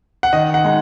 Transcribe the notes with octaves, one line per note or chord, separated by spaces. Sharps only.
F#5
D#3 D#5
F#5
G#3 D#4